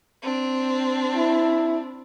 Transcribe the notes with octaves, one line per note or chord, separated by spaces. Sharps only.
C4 D4
E4